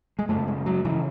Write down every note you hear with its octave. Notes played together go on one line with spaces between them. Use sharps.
G#3
F#2 C#3 A3
G#3
F#3
C#3 E3